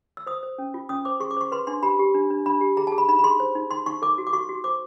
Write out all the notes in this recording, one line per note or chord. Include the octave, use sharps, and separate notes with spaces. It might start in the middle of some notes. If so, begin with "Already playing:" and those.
E6
C5 D#6
C5
C#4
F4
C#4 D#6
C5 D6
G#4 C#6
D6
C5 C#6
B4 C6
D4 C6
G4 B5
G4
D4
D4
D4 B5
G4
G#4 A#5
A5
G#4
B5
D#4 B5
B5
G#4 C6
C5
D#4
D#4 C6
D#4 C#6
A4 D6
F#4
D6
F#4 C#6
F#4
C5 D6